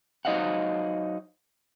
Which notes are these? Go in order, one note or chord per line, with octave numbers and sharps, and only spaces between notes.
F#3 D#4 C5 D#5 F5 F#5